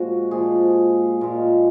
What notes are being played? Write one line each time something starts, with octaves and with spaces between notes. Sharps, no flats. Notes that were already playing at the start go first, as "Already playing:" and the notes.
Already playing: A#2 F3 G#3 F#4
A#2 F3 G#3 G#4
A#2 G#3